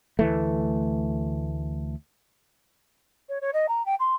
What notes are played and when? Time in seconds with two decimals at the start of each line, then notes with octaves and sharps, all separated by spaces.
0.19 D2 E3 A3
3.29 C#5
3.42 C#5
3.54 D#5
3.69 A#5
3.86 G5
4.00 C6